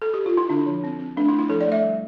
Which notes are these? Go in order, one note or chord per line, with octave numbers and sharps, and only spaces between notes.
A4
G4
F4
E4
D3 D4
F3
C4
C4
A3 D4
E4
A3
E4
F3 A4
D5
A3 E5
G3